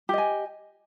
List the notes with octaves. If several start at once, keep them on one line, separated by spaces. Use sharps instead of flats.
G4 D#5 G#5